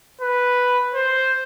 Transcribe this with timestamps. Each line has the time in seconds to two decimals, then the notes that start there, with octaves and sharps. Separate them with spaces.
0.21 B4
0.95 C5